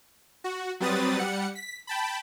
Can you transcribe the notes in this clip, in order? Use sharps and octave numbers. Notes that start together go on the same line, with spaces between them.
F#4
F#3 G3 C4 B4 D#6 A6
G3 F#5 C#7
B6
G5 A5 B5